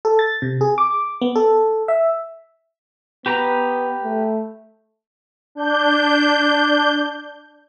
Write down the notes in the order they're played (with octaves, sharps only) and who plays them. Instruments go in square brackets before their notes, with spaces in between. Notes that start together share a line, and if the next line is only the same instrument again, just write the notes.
[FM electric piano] A4
A6
C3
G#4
D6
B3
A4
E5
[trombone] B3 [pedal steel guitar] G4 B4 A#5
[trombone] A3
[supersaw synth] D4 G6